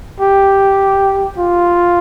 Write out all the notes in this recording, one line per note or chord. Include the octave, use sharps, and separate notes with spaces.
G4
F4